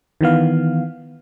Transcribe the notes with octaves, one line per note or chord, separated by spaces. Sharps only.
D#3 E3 B3 F5